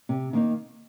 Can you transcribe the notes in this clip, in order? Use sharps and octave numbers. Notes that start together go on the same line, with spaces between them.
C3
D#3 A#3 D#4